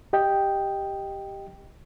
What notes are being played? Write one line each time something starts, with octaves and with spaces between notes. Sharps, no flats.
G4 D#5 G5